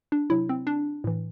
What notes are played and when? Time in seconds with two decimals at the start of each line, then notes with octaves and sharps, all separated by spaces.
0.12 D4
0.30 C3 F#3 E4
0.49 C4
0.67 D4
1.04 A2 E3